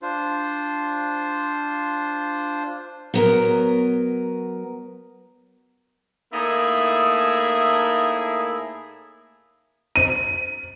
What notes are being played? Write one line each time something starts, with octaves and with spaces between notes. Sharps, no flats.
D4 F4 C5
F#3 B3 A#4
A2 A3 A#3 D#4 E4 G#4
D#7